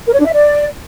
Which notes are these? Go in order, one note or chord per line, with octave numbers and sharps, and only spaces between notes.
A#4
C#5
D4
E5
D5